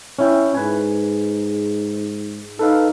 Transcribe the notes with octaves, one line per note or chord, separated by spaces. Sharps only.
C#4 E4 G5
G#2 B4 G#5
D#4 A4 B4 F5